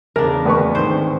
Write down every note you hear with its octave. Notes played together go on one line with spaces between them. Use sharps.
E2 C#3 D4 A#4
D2 B4 C#6
G#2 D#3 C4 C5